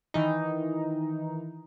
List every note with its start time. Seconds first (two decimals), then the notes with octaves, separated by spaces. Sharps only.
0.14 D#3 E3 D#4